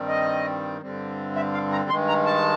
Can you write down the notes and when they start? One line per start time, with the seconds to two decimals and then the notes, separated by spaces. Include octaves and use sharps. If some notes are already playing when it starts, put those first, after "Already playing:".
Already playing: G2 D#3 G3 C4
0.08 D#5
0.81 G2 D3 G3 C4
1.36 E5
1.53 F5
1.72 A#5
1.89 G2 D#3 G#3 C6
2.08 A#5
2.26 A5